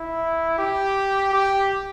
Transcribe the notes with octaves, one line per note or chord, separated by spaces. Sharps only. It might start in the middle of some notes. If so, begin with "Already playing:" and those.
Already playing: E4
G4
G4